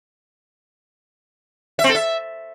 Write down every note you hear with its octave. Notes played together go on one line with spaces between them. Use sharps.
E5
C4
A4
E5